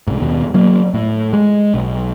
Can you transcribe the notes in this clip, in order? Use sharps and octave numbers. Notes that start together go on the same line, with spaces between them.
C2 G#2
D#2 B2
F#3 A#3
A2
G#3
B1